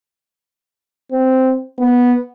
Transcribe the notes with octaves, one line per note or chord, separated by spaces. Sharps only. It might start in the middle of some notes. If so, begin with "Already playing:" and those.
C4
B3